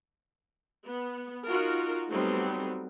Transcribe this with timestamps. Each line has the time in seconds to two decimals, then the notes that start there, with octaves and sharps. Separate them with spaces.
0.85 B3
1.46 D#4 F4 F#4 A#4
2.10 F#3 G3 A3 B3 C4 D#4